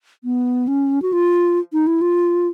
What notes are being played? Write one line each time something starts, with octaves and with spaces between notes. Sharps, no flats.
B3
C#4
F#4
F4
D#4
E4
F4